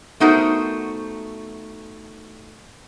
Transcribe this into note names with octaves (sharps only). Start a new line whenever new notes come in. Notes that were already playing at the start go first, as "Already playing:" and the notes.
A3 B3 D#4 F#4 A#4 C5